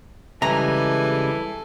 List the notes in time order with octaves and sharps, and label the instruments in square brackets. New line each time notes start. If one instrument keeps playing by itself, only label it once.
[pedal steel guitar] C#3 G3 G#3 [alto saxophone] E3 [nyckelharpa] A4 G#5 [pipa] A#5